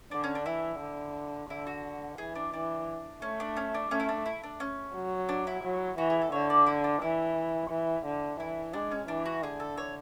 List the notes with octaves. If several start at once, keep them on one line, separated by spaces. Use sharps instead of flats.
D3 D4
C#4
D4
E3 E4
D3
D3 E4
F#4
E3 G#4
D4
E3 D4
A3 C#4
D4
C#4
D4
A3 C#4
E4
D4
E4
D4
C#4
F#3
D4
E4
F#3
E3 F#4
G#4
A4
D3 C#5
D5
E4
D4
E3 E4
E3
D3
E3 E4
G#3 D4
C#4
E3 D4
F#4
D3 G#4
A4
C#5